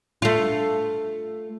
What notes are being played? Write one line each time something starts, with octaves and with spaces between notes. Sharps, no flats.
A3 F4